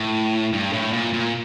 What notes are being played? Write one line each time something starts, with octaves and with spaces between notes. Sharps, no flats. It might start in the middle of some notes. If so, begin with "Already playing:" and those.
Already playing: A2
G2
A2
A#2
A#2